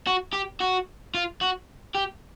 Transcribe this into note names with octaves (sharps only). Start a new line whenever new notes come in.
F#4
G4
F#4
F4
F#4
G4